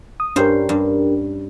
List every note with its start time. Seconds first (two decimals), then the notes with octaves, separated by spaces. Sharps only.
0.20 D#6
0.36 G2 C#4 D4 G4 A#4 C5
0.69 G2